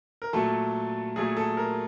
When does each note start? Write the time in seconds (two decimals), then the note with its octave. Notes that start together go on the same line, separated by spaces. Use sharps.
0.22 A#4
0.33 A#2 F#3 A3 A4
1.16 A#2 F#3 A3 G#4
1.37 A4
1.57 A#4